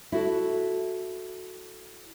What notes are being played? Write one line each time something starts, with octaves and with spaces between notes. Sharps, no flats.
E4 F#4 A4